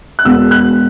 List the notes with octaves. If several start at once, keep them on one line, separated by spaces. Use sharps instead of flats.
F#6
E1 E2 B2 B3 E6
F#6